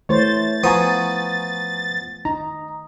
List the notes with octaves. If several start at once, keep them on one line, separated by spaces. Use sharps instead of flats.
E3 A3 C5 C#5 A6
F3 B3 G#5 A#5 C#6 D#6
D#4 A#5